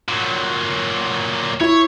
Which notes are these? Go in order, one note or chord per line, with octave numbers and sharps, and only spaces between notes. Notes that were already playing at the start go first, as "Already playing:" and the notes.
A#2 F#3
E4 C#5